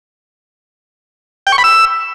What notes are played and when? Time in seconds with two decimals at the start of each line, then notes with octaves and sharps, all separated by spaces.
1.47 G5
1.52 C#6
1.58 B5
1.64 E6